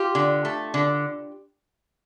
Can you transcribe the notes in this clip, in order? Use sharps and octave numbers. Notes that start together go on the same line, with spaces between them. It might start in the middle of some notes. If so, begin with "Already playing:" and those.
Already playing: F4 G4
D3
A3
D3